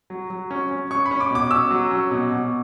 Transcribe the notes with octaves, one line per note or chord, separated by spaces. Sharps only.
F#3
F#3
C#4
C#4
C#4 C#6
B5
C#4
D6
B2 D6
C#4 E6
F#3
C#4
B2
B2